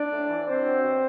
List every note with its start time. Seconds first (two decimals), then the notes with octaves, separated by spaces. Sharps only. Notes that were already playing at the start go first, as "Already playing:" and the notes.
Already playing: D4 D5
0.11 A2
0.29 E3
0.46 C3 C4 C5
0.65 F#3
0.83 B2